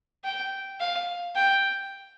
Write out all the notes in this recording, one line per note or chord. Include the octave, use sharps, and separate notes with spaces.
G5
F5
G5